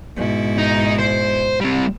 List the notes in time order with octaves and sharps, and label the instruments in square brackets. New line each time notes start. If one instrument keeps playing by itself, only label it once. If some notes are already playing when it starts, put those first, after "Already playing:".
[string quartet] G#2 B2 E4
[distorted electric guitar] D#4
C5
G3 C4